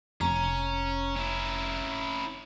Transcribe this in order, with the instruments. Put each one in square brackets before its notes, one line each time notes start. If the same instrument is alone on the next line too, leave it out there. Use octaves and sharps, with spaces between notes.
[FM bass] F1 [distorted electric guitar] C#4 [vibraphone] A#5
[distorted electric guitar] C#4 E4